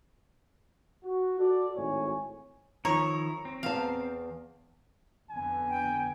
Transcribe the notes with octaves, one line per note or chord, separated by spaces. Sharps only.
F#4
F#4 A4 D5
G#1 A2 C#5 G#5
D#3 F3 E4 C#5 A#5
C4
E2 F5 A5
F2 D3 B3 G#5
G5